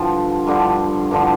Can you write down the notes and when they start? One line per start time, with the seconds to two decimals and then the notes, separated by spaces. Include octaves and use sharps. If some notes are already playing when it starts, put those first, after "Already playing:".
Already playing: G2 D3 F3
0.47 G2 D3 F3
1.11 G2 D3 F3